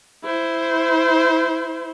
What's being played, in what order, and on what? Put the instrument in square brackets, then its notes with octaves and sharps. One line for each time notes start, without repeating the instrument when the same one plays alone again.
[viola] E4 C5